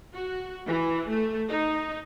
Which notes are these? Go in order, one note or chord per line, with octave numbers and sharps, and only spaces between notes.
F#4
E3
A3
D#4